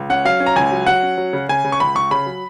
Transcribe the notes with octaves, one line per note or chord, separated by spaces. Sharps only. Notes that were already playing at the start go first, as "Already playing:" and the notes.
Already playing: C#2
C#4 F#5
F#3 F5
C#4
A#5
C#2 G#5
F#3
F#3 F#5
C#4
F#3
C#3
C#3 G#5
C#3
C#6
C#2 B5
C#2 C#6
C#3 B5
F#3